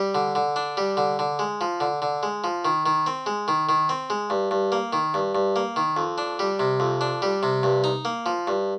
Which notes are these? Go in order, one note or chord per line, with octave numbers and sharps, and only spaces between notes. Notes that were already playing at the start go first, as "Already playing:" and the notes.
Already playing: G3
D3
D3
D4
G3
D3
D3
G#3
F3
D3
D3
G#3
F3
D#3
D#3
C4
G#3
D#3
D#3
C4
G#3
G2
G2
A#3
D#3
G2
G2
A#3
D#3
F2
D4
G3
C3
F2
D4
G3
C3
G2
D#4
A#3
F3
G2